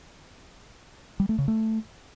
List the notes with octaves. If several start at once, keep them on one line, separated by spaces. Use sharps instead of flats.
G3
A3
C#3
A3